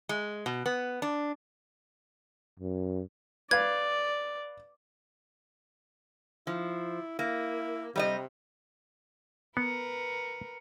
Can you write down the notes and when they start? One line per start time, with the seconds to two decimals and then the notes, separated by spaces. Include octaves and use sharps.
0.09 G#3
0.46 B2
0.66 B3
1.02 D4
2.60 F#2
3.51 B4 D5 F5 G#6
6.47 F3 E4
7.19 A#3 E4
7.96 C3 G3 D5 D#5
9.57 B3 A#4 B4 C#7